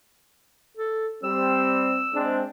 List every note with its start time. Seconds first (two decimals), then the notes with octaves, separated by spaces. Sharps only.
0.77 A4
1.24 G3 C4 E6
2.13 G#3 C4 D4